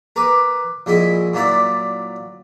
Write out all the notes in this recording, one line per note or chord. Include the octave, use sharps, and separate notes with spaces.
A#4 B4 D6
A#1 G#3 E4 E5
A#2 F#3 E4 D5